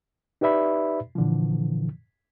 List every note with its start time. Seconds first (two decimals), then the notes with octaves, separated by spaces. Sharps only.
0.41 D#4 G4 B4 D5 E5 B5
1.15 A#2 D3 E3 F3